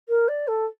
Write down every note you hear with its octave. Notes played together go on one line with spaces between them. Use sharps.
A#4
D5
A4